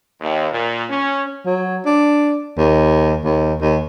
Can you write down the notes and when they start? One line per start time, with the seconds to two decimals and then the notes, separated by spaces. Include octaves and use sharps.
0.21 D#2
0.51 A#2
0.89 C#4
1.46 F#3
1.86 D4
2.58 D#2
3.24 D#2
3.61 D#2